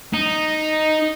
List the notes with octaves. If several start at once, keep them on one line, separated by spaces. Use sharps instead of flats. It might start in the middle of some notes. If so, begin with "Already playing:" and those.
D#4